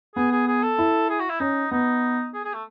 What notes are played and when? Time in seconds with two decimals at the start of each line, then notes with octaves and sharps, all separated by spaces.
0.15 B3 G#4
0.31 G#4
0.48 G#4
0.63 A4
0.78 E4
1.09 G#4
1.20 F#4
1.30 E4
1.40 C#4 D#4
1.71 B3 D#4
2.34 G#4
2.44 G#4
2.54 A3